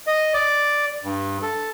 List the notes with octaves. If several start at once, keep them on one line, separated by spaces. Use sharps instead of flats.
D#5
D5
G2
A4